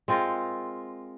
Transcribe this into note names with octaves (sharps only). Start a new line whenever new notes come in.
G#3 C4 F4 A#4